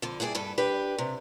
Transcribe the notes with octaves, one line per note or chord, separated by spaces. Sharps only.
F2 D3
G2 E4 G#4 A4 D5
G2 A4 B4
D4 G4 B4
C3